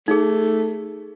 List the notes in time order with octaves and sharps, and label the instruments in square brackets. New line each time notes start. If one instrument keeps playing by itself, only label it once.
[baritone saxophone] A3 [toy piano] D#4 G#4